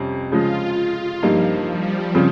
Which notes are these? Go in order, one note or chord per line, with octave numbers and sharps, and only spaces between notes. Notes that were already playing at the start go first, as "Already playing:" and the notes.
Already playing: F2 C3 G3 C#4
C#3 F3 G#3 F4
G2 F3 G3 A#3 D#4
G3
C#3 F3 C4